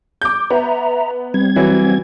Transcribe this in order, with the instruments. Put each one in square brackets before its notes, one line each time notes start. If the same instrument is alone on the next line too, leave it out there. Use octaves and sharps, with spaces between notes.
[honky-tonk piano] D6 G6
[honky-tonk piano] B3 [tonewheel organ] E5 A#5
[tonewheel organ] G3 C4 G#6
[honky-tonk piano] E3 F#3